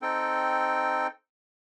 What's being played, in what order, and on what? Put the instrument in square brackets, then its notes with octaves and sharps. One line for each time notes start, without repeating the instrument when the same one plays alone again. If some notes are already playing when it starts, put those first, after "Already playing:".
[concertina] C4 D#4 A4 G5